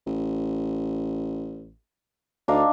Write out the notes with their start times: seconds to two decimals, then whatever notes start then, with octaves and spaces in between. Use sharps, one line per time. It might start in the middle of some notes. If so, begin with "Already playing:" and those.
0.07 A1
2.48 D2 D4 D#4 F5